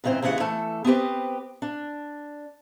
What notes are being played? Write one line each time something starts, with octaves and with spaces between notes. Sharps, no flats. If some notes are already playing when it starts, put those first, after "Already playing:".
G#2 C#3 E3 C4 C5
D#2 C#3 E3 A#4 F#5
E3 A3 A4
B3 C4 G4 B4
D4